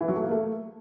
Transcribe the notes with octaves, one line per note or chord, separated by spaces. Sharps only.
E3
F#3
A3
A#3
A3